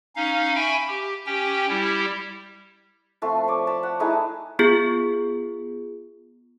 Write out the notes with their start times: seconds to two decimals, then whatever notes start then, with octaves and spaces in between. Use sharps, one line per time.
0.16 C#4 D#4 F5
0.55 E5 G5 G#5 B5 C#6
0.88 G4
1.26 C#4 G4 G5
1.69 G3 E4 G4
3.22 F3 A3 C4 C6
3.48 C#5 D5
3.67 A5 B5
3.83 F#5
4.00 A3 D#4 E4 G#4
4.59 B3 F4 G#4